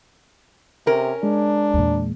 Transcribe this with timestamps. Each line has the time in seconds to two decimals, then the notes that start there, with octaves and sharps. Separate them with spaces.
0.86 C3 C#4 A#4
1.23 G#3 D4
1.74 E2 A#2